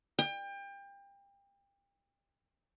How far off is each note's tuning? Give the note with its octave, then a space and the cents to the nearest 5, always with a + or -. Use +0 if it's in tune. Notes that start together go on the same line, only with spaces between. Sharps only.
G5 +30